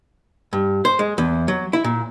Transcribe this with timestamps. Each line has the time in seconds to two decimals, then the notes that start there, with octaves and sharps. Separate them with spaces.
0.53 G2
0.85 C5
0.99 G#3
1.18 E2
1.48 F#3
1.73 E4
1.84 A#2